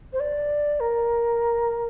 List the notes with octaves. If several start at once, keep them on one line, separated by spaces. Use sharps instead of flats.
C5
D5
A#4